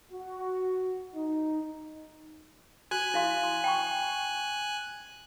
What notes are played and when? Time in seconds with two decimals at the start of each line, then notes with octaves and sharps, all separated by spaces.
0.10 F#4
1.14 D#4
2.91 F#4 G#5 F#6
3.14 E4 F5 C6
3.44 C6
3.64 G5 B5 C#6